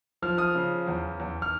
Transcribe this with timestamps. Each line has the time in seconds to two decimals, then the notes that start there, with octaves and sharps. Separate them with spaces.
0.22 F3 F6
0.38 D#6 F6
0.55 C#3
0.87 E2
1.20 E2
1.42 F6